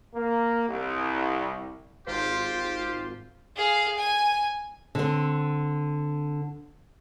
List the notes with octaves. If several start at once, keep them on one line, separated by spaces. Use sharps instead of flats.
A#3
C2
G#1 F4 G4 C5
G#4 F5
G#5
D3 C4